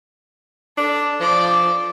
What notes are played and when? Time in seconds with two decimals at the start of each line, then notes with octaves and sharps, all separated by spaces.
0.78 D4 A4 A5
1.20 F3 D5